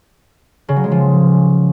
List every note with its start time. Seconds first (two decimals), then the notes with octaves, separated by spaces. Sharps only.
0.68 C#3
0.76 F#3
0.84 G#3
0.91 F3